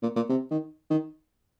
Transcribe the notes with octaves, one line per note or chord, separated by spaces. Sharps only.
A#2
A#2
C3
D#3
D#3